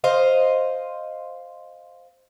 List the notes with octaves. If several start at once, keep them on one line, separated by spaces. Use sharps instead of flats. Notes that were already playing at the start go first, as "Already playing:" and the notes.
C5 D#5 F5